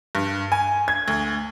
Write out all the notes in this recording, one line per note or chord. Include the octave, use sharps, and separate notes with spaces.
G2
G#5
G#6
D2